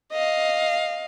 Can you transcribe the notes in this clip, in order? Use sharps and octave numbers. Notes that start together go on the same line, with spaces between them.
D#5 F5